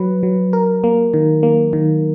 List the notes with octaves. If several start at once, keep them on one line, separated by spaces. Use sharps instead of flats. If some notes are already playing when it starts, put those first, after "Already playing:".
Already playing: F#3 B4
F#3
A#4
A#3
D#3
A#3
D#3